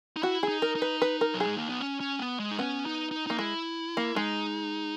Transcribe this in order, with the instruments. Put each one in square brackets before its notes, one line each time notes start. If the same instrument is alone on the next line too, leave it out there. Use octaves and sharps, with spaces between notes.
[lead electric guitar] D#4
[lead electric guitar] E4 [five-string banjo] F#4
[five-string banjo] G#4
[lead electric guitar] D#4
[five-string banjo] A#4
[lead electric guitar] D#4
[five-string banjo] B4
B4
A#4
[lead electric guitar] F#3
[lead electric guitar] G#3 [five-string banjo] G#4
[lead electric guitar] A#3
B3
C#4
C#4
B3
G#3
D#4
[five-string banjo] B3 [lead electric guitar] C#4
[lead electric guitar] D#4
D#4
[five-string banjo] A#3 [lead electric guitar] D#4
[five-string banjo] G#3 [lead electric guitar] E4
[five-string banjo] A#3
[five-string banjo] G#3 [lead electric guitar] D#4